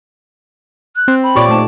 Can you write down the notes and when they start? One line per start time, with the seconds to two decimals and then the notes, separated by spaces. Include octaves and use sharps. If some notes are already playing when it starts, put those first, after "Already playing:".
0.95 F#6
1.08 C4
1.23 B5
1.35 A#2 F4 G4 C#5 D5
1.49 A3 D#4 A5